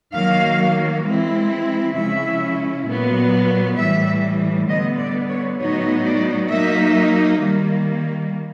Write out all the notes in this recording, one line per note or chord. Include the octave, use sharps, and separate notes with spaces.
D#3 F#3 A#3 F5
E3 G#3 C4 E4
C#3 F3 G#3 C#4 E4 E5
A#2 F#3 B3
A2 E3 G3 E5
D3 G3 B3 D#5
D5
C#5
A2 F#3 B3 D#4 C#5
D5
F#3 A#3 D#4 E5
D#3 G3 A#3